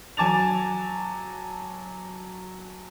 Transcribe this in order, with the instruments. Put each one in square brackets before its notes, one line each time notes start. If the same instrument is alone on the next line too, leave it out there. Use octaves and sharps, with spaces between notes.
[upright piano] F#3 G#5 A5 D6 A6 F7